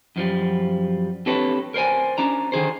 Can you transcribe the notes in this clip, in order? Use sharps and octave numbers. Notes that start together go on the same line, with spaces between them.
F#2 F3 G3
C4 D4 G4 A4 B4 C#5
A#4 C5 D5 G#5
C#4 D4 A#5
D3 D#3 G#4 C5